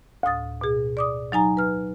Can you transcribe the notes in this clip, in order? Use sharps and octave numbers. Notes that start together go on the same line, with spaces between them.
D2 A2 D#6 A6
B2 G#4
D5 D6 D#6
F#3 D#4 G#5 A#5
B4 F6